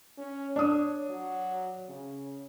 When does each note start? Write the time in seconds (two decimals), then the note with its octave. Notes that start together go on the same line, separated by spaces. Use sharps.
0.18 C#4
0.56 D4 C#5 D#6
1.10 F#3
1.89 C#3